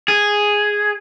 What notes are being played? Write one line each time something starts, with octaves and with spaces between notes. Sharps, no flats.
G#4